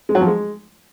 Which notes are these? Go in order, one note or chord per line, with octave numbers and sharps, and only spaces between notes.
G#3
F#3
F3
G#3